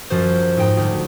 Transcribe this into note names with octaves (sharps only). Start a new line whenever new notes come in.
F#2 F3 F#4 C5
G#2 D#4 G5
D2